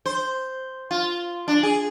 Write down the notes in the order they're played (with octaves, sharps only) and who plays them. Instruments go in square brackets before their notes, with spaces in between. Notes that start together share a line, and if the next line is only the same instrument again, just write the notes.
[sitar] C5
F4
D4
G#4